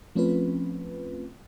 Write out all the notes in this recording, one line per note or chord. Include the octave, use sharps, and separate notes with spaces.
F3 A3 C4 C#4 F4 B4